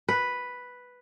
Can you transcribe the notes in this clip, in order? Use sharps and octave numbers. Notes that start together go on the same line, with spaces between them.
B4